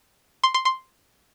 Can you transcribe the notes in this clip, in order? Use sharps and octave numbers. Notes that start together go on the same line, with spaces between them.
C6
C6
C6